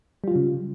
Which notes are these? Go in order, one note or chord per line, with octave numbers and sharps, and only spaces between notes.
C#3 F#3 G3 F4